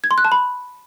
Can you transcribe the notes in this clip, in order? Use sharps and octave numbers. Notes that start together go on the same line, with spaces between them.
G#6
C6
F#6
A5
B5